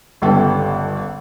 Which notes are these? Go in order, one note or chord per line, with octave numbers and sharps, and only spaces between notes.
G1 C#2 D3 G3 B3 A4